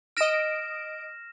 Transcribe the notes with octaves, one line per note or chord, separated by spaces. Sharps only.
D#5 F6 A#6 D7 E7